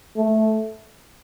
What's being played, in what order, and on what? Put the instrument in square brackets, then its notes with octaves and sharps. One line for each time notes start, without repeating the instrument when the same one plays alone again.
[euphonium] A3